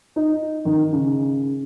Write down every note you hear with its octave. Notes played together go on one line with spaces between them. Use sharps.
D#4
D#3
C#3